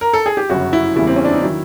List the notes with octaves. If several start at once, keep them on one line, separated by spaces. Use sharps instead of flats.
A#4
A4
G#4
G4
G1 F#2 C#3 F#4
E4
E2 C#3 E3 G3 A#3 E4
C4
C#4
D4
D#4
D#3 F#3 E4